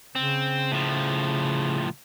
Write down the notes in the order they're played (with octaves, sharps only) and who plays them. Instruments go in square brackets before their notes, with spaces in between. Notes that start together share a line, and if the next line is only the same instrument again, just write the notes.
[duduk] C#3 [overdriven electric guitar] C4
[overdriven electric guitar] A2 F3